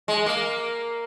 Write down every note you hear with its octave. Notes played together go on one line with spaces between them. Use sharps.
G#3
A#3